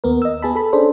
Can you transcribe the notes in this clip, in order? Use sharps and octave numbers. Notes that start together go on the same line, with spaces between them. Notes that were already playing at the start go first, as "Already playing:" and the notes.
D#2 B3 A#4
D#5 E6
B3 G#4 A5 B5
A4 B5
C#4 D4 G#4 A4 C5